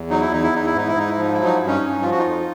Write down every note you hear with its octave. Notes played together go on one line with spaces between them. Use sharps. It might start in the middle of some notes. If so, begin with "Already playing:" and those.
Already playing: E2
F#3 D#4
E4
E2 D#4
E4
E2 D#4
E4
G#2 D#4
E4
G#2 D#4
E4
F3 D#4
F#3 E4
D#4
G2 E4
C#4 D#4
G2
F3 F4
F#4
D#4 F4
F2